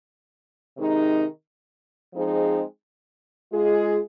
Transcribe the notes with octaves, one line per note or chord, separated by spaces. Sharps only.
C3 D#3 G#3 D#4
F3 G#3 C4 D#4 G#4
G#3 F4 G#4